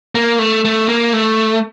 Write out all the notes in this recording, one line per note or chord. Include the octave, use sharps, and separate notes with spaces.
A#3
A3
A3
A#3
A3